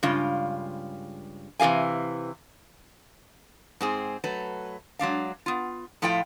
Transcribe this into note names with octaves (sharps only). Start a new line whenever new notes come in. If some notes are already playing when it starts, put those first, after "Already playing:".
G2 C#3 G#3 F4
C3 E3 G#4 F5 G#5
G#2 C4 G#4
F#3 A3 B4
F#3 G#3 D4 F5
B3 F4
A2 F3 E4 F4 A4 G5